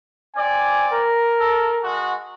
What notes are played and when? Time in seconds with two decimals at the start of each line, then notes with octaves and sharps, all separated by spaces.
0.35 C4 D5 G#5
0.93 A#4
1.39 A4
1.82 G#3 F#4